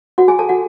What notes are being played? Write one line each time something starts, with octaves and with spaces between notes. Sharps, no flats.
F#4 F#5
G#4 G#5
A4 A5
F#4 F#5